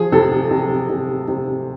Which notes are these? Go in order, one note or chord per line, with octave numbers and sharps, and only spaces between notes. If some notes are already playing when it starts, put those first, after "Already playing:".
Already playing: F3 G#4
C3 A4
C3
C3
C3